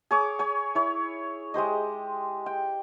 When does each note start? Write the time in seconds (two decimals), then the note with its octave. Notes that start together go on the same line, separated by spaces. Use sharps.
0.11 G#4 C#5 D6
0.39 C#5 G#5
0.75 E4 C#5
1.54 G#3 G4 C5 D#5
2.46 G5